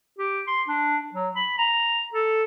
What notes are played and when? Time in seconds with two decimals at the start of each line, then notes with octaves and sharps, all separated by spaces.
0.18 G4
0.47 C6
0.68 D4
1.14 F#3
1.36 B5
1.58 A#5
2.14 A4